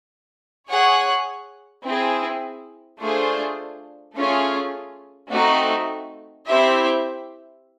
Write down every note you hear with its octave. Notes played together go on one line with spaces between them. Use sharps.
G#4 C#5 F#5
C4 E4 G#4
A3 D4 F4 G#4 C5
A3 C#4 F4 G#4
A3 C4 D#4 F#4
C4 E4 G4 C5 E5